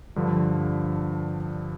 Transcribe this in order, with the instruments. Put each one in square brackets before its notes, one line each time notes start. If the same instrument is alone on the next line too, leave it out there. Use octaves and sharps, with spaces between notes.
[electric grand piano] G2 D3 F3